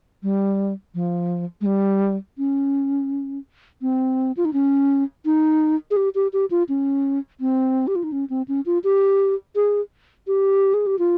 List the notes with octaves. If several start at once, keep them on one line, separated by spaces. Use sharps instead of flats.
G3
F3
G#3
G3
C#4
C4
F4
D#4
C#4
D#4
G#4
G4
G4
G4
F4
C#4
C4
G4
F4
D#4
C#4
C4
C#4
F4
G4
G#4
G4
G#4
G4
F4